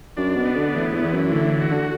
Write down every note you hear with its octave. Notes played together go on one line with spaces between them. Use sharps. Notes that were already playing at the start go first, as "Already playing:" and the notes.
F#2 D4
B2
B3
D3
A2 E3
E2
E3
F#2
A2 D3
F#4
D3